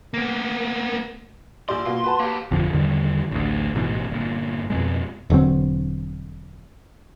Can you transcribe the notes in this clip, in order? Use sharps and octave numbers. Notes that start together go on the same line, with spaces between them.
A#3 B3
A#1 G4 D5 C6
B2 A#3 F4
F#4 B4 A5
A#3 G4
G#1 F2 D3 F3
E2 D3 D#3 G3
A1 D2
A1 G#2 B2 E3
G1 A#2
F2 B2 G#3
E1 D3 F#3 C4